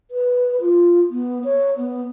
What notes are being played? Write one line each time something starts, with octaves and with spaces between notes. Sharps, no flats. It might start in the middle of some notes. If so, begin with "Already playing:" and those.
B4
F4
B3
C#5
B3